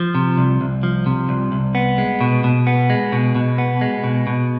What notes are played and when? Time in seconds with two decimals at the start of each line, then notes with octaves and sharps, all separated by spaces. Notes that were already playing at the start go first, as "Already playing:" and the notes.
Already playing: F3
0.15 C3
0.38 C2
0.61 C2
0.83 F3
1.06 C3
1.29 C2
1.52 C2
1.75 B3
1.98 G#3
2.21 B2
2.44 B2
2.67 B3
2.90 G#3
3.12 B2
3.35 B2
3.58 B3
3.81 G#3
4.04 B2
4.27 B2